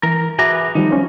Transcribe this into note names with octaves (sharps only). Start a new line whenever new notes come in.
E3 A#4
F#4 G#4 B4 E5 A#5 D6
D#3 F3 G3 D#4
C#4 C5